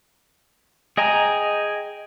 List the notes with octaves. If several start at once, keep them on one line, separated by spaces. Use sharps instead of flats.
G#4 D#5 G5 G#5 A#5